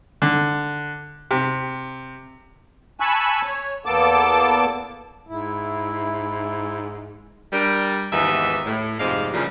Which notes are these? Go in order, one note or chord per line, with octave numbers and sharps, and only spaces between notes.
D3
C3
G#5 A5 B5 C#6 E6 F#6
C#5
E2 A#3 B3 A4 A5 D6
G#2 E4
G3 D4 A#4
D#2 G#2 E3 B3 D#4 E5
A2
F2 G#2 C3 G3 G#3 F5
A#2 C#3 E3 F3 G3